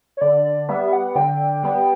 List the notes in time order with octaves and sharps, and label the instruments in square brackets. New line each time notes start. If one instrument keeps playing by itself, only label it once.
[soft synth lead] C#5
[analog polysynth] D3 [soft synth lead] D5
[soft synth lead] D5
[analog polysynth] G3 B3 [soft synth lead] E5
[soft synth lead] F#5
[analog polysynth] D3 [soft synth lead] G5
[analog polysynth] G3 B3